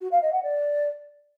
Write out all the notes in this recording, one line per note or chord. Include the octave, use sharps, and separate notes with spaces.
F#4
F5
D#5
F#5
D5